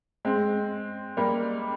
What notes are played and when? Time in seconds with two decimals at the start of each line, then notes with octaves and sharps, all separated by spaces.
0.25 G#3 C4
1.17 G3 A#3